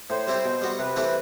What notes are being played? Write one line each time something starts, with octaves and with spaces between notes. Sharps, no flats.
A2 C5
G3 C4 E4 G4
B2
G3 B3 F#4
C3 B4
E3 A3 C4 G4